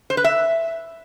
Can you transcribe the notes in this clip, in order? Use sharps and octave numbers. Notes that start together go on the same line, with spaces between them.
C5
B4
E5